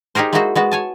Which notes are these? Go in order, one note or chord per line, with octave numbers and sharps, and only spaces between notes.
D#4 G4 G#4 A#4 C5
G#3 A#3 D#4 E4 F#4 C5
G#3 B3 F#4
C#5 G#5 A5